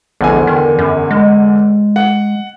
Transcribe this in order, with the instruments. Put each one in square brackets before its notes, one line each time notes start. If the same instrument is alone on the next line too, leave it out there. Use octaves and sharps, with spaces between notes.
[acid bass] A#1 [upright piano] E2 D3 G#5
[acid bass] D#3
F#2
G#3
[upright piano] F#5